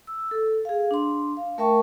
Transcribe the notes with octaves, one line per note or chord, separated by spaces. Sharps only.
E6
A4
G#4 F5
D4 C6
F5
A3 A#4 E5 G5 A5 C#6